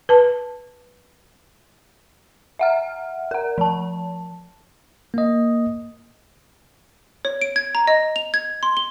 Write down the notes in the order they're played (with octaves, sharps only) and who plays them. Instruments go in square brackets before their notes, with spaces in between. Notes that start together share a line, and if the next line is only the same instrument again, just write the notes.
[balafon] B4 A5
[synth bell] E5 F#5 F6
A#4 F#5
F3 A5
[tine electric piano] A#3 D#5
[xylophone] C#5
D7
G#6
A#5
D#5
F7
G#6
C6
G7